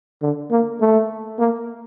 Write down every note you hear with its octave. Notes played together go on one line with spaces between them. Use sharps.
D3
A#3
A3
A#3